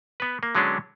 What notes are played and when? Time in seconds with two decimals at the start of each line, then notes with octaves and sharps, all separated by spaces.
0.20 B3 B4
0.43 A#3
0.55 D3 F#3 G#3 B3 C#4 D4